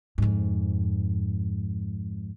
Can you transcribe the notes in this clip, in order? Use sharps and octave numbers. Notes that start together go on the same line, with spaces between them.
F2 G#2